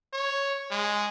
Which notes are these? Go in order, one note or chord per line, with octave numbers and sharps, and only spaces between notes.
C#5
G#3